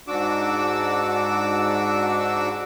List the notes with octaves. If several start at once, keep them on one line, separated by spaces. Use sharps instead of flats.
G#2 D4 F#4 D6 E6